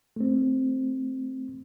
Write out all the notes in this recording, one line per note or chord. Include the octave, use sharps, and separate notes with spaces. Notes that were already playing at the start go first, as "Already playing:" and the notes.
A3 C4